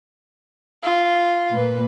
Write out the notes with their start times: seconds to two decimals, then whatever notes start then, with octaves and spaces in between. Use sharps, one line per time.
0.83 F4
1.51 A#2 B4